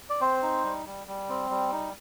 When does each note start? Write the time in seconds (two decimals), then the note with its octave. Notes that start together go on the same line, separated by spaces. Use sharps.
0.10 D5
0.21 C4 C5
0.43 D#4
0.64 G3
0.86 G3
1.07 G3
1.29 C4
1.50 G3
1.72 D#4